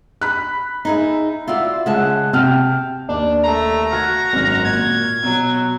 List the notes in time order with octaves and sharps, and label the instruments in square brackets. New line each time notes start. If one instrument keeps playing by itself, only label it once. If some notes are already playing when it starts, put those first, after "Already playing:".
[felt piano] B5 F#6
[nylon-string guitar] D#4 G#4 E5
[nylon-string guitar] F4 F#4 D5 [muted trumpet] E5
[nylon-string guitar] C#3 G#3 A5 [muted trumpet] F#5
[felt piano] C3 F6 [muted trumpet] G5 [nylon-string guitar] A5
[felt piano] D#2 [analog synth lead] D4
[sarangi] A3 [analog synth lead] A#5
[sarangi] F#4 [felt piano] F6 G#6
[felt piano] G#1 F#2 F6
[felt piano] A#2 [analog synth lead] G#6
[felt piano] B2 [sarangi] F#3